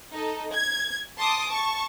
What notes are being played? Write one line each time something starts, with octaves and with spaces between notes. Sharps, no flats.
D#4 A4
G#6
A5 C6 D6 D#6
A5 C#6